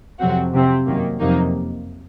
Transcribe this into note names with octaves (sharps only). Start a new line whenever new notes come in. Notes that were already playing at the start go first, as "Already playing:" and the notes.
F2 C3 F#3 C4 F#4
C3 F3 C4
F#2 D#3 A#3
F2 C3 F#3 A#3 D#4